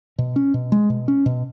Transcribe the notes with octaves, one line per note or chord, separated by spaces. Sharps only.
B2
C#4
B2
G#3
B2
C#4
B2